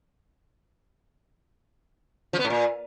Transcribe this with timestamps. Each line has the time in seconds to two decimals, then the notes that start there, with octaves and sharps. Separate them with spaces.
2.33 F3
2.39 B3
2.45 A2
2.50 A#2